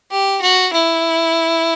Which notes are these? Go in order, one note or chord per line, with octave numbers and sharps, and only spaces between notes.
G4
F#4
E4